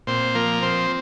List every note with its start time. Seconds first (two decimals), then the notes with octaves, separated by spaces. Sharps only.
0.07 A#2 C4 C5
0.35 F3 A#3 A#4
0.62 C4 C5